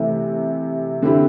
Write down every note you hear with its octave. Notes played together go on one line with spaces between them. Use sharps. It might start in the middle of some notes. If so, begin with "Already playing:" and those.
Already playing: C3 E3 A3
D3 C4 E4 G4